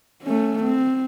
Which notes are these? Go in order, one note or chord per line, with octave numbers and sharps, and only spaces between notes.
A3 C#4
C4